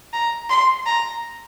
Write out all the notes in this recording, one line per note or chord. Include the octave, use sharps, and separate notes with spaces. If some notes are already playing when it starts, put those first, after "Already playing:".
A#5
C6
A#5